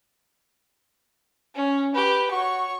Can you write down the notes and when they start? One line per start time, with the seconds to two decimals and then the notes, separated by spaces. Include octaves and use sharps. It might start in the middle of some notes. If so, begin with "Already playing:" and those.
1.55 C#4
1.95 G4 B4
2.31 F#4 C#5 C#6